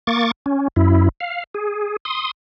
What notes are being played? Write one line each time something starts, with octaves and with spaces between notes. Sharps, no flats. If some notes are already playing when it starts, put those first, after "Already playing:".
A#3 C#6 D6 A6
C#4
F#2 E4
F5
G#4
C6 D#6